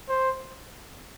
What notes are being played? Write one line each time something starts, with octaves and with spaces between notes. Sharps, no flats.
C5